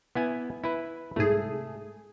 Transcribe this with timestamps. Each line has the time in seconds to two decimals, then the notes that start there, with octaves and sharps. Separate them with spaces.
0.15 B3 E4 G#5
0.64 E4 B4
1.16 C2 G#2 A3 G#4